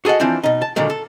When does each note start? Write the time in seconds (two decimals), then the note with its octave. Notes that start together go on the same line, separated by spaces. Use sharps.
0.05 F#4 G#4 A4 D#5 F#5
0.20 E3 F3 C4 D4
0.43 B2 D#4
0.62 A5
0.76 A#2 D3 D#3 F#3 G#3
0.90 A4